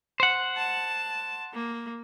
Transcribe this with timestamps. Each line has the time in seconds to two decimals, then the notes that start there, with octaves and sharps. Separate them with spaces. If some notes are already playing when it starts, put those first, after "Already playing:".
0.20 C5 F#5
0.57 A5
1.53 A#3